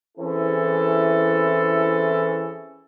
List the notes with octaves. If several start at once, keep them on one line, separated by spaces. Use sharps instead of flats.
E3 C4 C#4 E4 G#4 A4